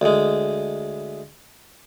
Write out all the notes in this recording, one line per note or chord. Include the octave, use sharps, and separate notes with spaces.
D2 G#3